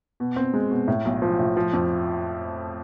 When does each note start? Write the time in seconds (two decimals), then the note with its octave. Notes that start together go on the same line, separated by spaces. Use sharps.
0.20 B2
0.36 C4
0.54 G#3
0.71 B2
0.88 A2
1.05 B1
1.22 F3
1.39 A2
1.57 F3
1.73 F2